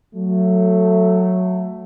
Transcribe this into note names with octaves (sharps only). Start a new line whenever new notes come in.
F#3 A3